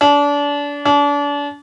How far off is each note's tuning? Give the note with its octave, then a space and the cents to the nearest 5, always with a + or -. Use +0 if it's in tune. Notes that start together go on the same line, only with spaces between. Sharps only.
D4 -30
D4 -35